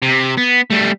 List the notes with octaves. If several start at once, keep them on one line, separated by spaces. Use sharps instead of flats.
C3
B3
G3 A3